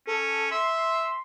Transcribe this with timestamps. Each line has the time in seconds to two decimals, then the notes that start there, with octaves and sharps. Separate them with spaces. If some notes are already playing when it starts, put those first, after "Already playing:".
0.07 C#4 A4
0.51 E5 C6